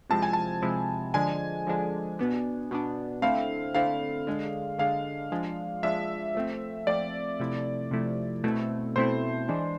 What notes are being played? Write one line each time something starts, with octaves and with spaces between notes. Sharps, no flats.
C3 F3 G#3 C4 E4 A5
G#5
A5
C3 F3 G#3 C4 E4
D3 F3 G#3 D4 G#5
D3 F3 G#3 D4
B2 B3 D4
B2 B3 D4
D3 A3 C4 E4 F5
D3 A3 C4 E4 F5
D3 G#3 D4
D3 G#3 D4 F5
F3 G#3 D4
F3 G#3 D4 E5
F3 A3 C4
F3 A3 C4 D5
C3 F3 A3 E4
C3 F3 A3 E4
B2 A3 C4 E4
B2 A3 C4 E4 C5
E3 G#3 D4